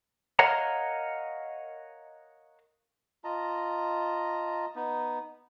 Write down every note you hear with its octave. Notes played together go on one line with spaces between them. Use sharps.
A#4 C#5 D#5 F5 F#5 A#5
F4 D#5 A5 A#5
B3 D#4